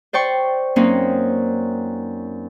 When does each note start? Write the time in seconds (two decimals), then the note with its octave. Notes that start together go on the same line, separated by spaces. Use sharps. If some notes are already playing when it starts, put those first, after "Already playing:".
0.13 C5 D5 G5 C#6
0.76 F#2 A#3 C4 C#4 D#4